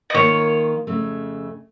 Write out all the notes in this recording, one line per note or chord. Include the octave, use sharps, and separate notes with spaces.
D#5
D#3 A#3 F4 C#5
F2 C#3 A3